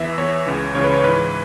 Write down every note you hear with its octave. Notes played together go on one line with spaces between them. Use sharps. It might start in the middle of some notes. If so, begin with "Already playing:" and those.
Already playing: E2 E3 E5
E2 E3 C#5
C#2 C#3 E3
C#2 C#3 E3 C#5
B4
C#5
G#2 E3 B4